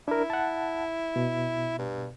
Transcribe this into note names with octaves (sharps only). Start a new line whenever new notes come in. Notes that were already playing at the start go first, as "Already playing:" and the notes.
D4 E4 A#4
F#5 A5
B2
G2